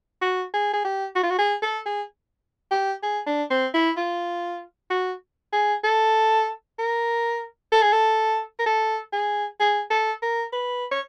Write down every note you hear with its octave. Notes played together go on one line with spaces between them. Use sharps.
F#4
G#4
G#4
G4
F#4
F4
F#4
G#4
A4
G#4
G4
G#4
D4
C4
E4
F4
F#4
G#4
A4
A#4
A4
G#4
A4
A#4
A4
G#4
G#4
A4
A#4
B4
C#5